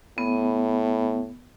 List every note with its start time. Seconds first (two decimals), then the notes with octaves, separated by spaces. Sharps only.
0.18 A2 B3